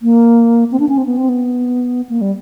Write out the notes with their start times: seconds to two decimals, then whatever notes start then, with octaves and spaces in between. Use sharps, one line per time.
0.02 A#3
0.72 C4
0.80 D4
0.89 C#4
0.97 C4
1.06 B3
1.17 C4
1.29 B3
2.09 A#3
2.21 G3